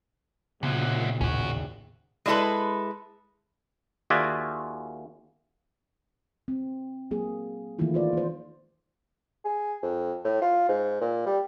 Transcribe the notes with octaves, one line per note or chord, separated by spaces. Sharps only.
D2 A#2 C#3 F#3 B3
A1 D#2 C#4 F#4
G#3 D4 E4 F#4 A4 B4
D#2 F4 F#4 G#4 D5 E5
C4
F#3 A#3 G#4
D#3 E3 A3 A#3 E4 F4
F4 C5 D5
A#3 C5
G#4
F2
A2
F4
G#2
A#2
G3